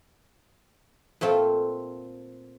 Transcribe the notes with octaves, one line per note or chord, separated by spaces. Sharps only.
A#2 A3 C4 F4